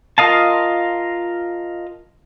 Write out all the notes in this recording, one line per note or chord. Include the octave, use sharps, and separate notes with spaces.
F4 A#4 D#5 F5 A5